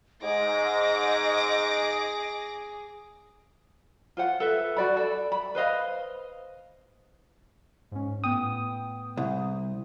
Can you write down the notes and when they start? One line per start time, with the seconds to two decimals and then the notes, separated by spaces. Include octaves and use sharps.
0.23 G#2 G#4 D#5 D6 A#6
4.17 F4 C5 F#5
4.40 A4 B4 E5
4.77 F#4 D5 B5
4.97 A4 D5
5.32 B5
5.55 B4 C5 D#5 F5
7.92 G#2 C#4
8.24 A2 B3 G5 D#6
9.17 C2